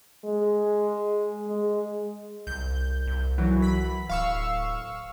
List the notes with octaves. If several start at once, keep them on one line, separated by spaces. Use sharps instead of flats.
G#3
G#3
C2 G6
C2
E3 F#3
B5 B6
D1 F5 C#6 E6